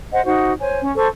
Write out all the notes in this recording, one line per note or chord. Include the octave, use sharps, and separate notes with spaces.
C5 D#5 F#5
D#4 F#4 C5 F#5
C5 C#5 G#5
C#4
A4 C5 C#6